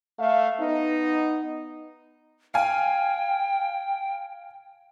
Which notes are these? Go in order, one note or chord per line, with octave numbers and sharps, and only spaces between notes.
A3 E5 F5
B3 D#4
F5 G5 G#5